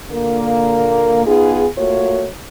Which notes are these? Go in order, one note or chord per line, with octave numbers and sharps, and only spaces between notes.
A#2 D3 A#3
B3 D#4 F4 G#4
A3 A#3 F4 F#4 C#5